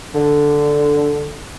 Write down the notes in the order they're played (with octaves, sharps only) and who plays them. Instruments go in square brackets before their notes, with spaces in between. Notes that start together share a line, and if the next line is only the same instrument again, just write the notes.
[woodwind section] D3